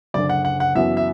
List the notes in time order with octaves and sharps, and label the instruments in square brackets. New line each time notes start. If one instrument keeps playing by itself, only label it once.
[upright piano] F#1 F#2 D3 [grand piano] D5
[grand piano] F#5
F#5
F#5
[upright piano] F#2 E3 B3 F#4 [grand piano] E5
[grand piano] E5